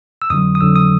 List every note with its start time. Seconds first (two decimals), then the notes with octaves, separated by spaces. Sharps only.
0.22 E6
0.30 F2 D3 F#3 D#6
0.55 D#6
0.61 F2 D3 F#3 E6
0.76 D#6